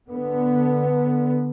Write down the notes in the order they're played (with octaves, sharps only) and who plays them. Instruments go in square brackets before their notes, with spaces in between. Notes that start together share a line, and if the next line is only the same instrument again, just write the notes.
[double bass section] D3 B3